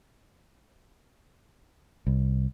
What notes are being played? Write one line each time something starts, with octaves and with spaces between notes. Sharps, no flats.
C2